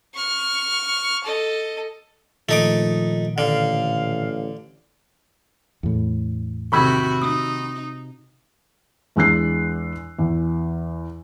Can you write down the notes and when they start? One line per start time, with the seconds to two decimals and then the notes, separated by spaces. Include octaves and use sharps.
0.15 C#6 F6
1.24 A4 D#5
2.49 A#2 D#3 F3 A3 D#4 D6
3.38 A1 D3 F5
5.83 E2 A2
6.72 C3 D#3 F#4 B5 C#6 E6 G6 G#6
7.22 D#4 D#6
9.16 E2 G#3 D4 E6 F#6 C7
10.18 E2